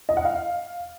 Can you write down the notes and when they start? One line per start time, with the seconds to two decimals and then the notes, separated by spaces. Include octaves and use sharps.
0.09 D#5
0.17 F#5
0.25 F5